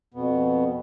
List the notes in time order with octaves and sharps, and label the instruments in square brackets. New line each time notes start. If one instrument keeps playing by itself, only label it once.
[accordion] F2 B2 B3